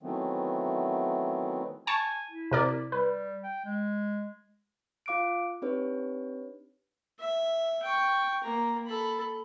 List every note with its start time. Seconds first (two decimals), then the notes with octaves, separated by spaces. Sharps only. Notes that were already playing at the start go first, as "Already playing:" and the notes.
0.03 D#3 E3 F#3 A3 B3 C4
1.87 G#5 A5 C#6
2.31 E4
2.51 C3 A#4 D5
2.92 G3 B4
3.43 G5
3.65 G#3
5.06 F4 F5 D6 F#6 D7
5.62 C4 D4 D#4 G4 B4 C#5
7.19 E5
7.83 G5 C#6
8.43 A#3 A#5
8.86 A4 B5